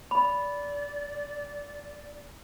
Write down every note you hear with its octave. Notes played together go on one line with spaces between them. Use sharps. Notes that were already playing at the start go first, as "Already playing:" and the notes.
D5 B5